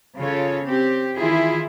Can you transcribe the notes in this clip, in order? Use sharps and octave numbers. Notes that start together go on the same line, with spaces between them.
C#3 F4 A4 C#5
C4 G4
D#3 E3 E4 F4 G#4